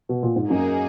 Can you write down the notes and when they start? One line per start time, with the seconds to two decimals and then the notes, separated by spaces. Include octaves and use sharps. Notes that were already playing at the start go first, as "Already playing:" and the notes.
0.09 B2
0.23 A#2
0.36 G#2
0.50 F#2 A#3 D#4 G#4